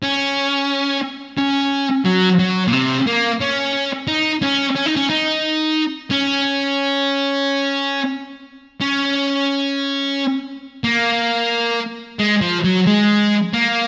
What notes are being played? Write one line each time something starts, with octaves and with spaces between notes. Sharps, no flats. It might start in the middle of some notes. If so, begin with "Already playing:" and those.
C#4
C#4
F#3
F#3
A#2
C3
A#3
C#4
D#4
C#4
C#4
D#4
C#4
D#4
C#4
C#4
A#3
G#3
F3
F#3
G#3
A#3